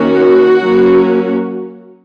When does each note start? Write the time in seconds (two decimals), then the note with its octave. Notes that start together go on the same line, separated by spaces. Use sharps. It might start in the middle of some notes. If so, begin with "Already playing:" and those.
Already playing: D#3 A#3 C#4 F#4
0.58 F#3 A#3 C#4